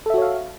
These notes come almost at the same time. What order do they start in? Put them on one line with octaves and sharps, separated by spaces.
A4 E5 F#4 C#5 F5